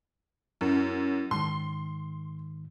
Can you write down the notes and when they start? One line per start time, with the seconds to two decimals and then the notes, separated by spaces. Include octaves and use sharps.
0.61 F#2 F#3 E4 A#4
1.31 G#2 D#3 C6